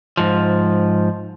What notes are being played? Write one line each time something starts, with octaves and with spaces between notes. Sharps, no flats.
G#2 F3